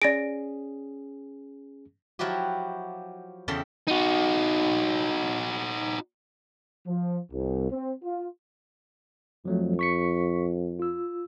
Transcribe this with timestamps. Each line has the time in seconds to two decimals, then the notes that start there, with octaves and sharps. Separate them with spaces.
0.02 C#4 G#4 D5 A#6 D7
2.19 F3 F#3 E4 F#4 G4
3.48 E2 C#3 A4 E5 G5 C6
3.88 D#4 F#4
6.87 F3
7.32 C2
7.71 C4
8.04 F4
9.45 F2 F3 F#3 A3
9.79 C#6 B6 C#7
10.79 F4 E6